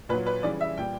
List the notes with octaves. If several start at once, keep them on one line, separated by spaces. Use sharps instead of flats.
A#2 F#3 B4
B4
C#3 E3 G3 D5
E5
A#2 G3 G5